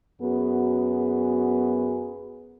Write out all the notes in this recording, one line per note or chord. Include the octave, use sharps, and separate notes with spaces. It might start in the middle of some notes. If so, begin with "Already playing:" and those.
F#2 B3 F#4 G#4